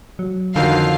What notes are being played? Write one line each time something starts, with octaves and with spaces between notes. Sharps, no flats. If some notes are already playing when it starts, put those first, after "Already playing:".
F#3
F2 D3 D#3 F#3 F5